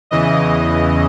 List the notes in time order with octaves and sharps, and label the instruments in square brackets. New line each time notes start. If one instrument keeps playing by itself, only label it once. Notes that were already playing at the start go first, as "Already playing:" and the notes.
[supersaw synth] E2 C#3 E3 D#5